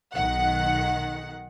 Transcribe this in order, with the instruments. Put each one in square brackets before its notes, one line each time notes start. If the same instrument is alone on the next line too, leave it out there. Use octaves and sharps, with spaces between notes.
[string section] B1 D#3 F#5